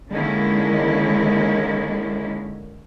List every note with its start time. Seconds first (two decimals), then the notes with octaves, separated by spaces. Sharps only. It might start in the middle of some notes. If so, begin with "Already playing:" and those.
0.11 D3 D#3 G#3 A#3 C#4 E4